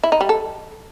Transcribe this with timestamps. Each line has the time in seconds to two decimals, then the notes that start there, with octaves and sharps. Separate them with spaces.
0.03 E4
0.12 D#4
0.21 G3
0.29 A4